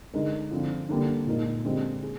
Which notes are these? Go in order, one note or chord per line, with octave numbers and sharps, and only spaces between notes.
D3 G#3 D#4 A#4
D3 F3 C4 F4
D3 G3 A#3 D4
A#2 G#3 D#4 A#4
D3 G#3 C4 G4
G#4